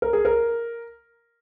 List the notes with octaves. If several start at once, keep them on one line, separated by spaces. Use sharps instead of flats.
A#4
G#4
A#4